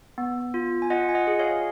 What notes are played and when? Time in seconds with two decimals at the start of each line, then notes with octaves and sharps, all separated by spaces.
0.18 B3
0.54 F4
0.82 G#5
0.90 F4 D#5 F#5
1.09 G#5
1.15 D#5 F#5
1.27 G#4
1.39 C#5 F5